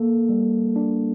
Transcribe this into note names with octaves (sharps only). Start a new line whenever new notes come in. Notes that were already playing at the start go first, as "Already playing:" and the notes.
Already playing: A#3 A4
G3
D4